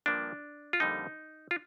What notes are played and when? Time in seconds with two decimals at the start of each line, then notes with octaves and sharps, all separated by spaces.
0.06 G2 F3 A#3 D4
0.73 F4
0.80 F2 D3 G3 A#3 D#4
1.51 F4